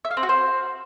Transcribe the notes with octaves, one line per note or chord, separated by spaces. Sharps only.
E5
F5
C4
F#4
C5